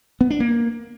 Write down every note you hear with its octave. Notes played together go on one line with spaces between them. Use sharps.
B3
D4
A#3